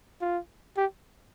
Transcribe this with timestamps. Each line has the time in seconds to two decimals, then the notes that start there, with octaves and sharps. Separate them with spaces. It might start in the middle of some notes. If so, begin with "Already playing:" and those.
0.21 F4
0.77 G4